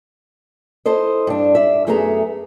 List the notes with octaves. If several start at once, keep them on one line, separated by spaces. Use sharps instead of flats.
E4 A4 C5 D#5
G2 D4
D4 E5
F#2 A3 B3 G#4 E5 A#5